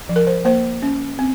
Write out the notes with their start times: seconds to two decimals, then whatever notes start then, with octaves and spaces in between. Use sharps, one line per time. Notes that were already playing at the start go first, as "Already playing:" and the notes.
0.09 F3
0.16 A#4
0.27 C5
0.45 A#3 C5
0.82 C#4
1.19 C4